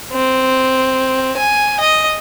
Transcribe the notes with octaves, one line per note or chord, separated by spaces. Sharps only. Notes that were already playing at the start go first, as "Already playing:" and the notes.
C4
G#5
D#5